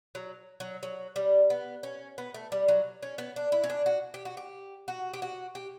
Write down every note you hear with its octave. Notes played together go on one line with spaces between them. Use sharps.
F#3
F#3
F#3
G3
B3
C#4
B3
A3
G3
F#3
C#4
B3
D4
E4
C#4
D4
F#4
G4
F#4
G4
F#4
G4
F#4
G4